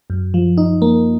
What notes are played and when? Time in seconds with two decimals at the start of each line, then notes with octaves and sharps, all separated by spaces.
0.10 F#2
0.34 F3
0.57 D#4
0.82 A#3